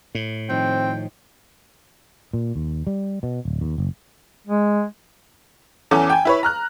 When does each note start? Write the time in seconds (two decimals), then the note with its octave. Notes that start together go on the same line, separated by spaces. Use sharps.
0.15 A2
0.49 D#3 F3 C4 G5
2.33 A#2
2.56 D#2
2.87 G3
3.23 B2
3.45 D1
3.61 D#2
3.78 F#1
4.47 G#3
5.91 E2 E3 C#4 A4 D6
6.10 G5 G#5
6.25 E4 B4 C#5
6.43 A#5 F6 F#6